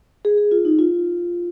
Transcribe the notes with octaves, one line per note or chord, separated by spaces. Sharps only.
G#4
G#4
F4
D#4
F4